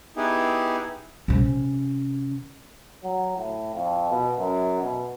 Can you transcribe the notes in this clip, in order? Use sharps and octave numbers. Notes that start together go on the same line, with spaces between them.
B3 D#4 E4 G4 G#4
C3 C#4
F#3
A2
F2
B2
F#2
B2